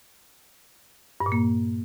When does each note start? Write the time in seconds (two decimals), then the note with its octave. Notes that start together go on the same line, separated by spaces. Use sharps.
1.20 G2
1.26 A#2
1.32 A#3